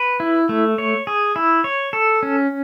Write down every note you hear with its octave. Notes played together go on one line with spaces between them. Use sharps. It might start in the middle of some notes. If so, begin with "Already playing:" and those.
Already playing: B4
E4
A3
C#5
G#4
E4
C#5
A4
C#4